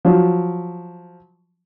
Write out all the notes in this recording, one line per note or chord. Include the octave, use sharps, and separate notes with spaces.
F3 F#3